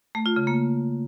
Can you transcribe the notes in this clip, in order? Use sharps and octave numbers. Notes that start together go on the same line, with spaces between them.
A3
F4
C#3
A#3